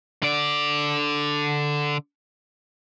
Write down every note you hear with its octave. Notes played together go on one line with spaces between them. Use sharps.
D3 D5